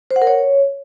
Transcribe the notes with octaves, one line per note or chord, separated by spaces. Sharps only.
C5
F#5
A#4
C#5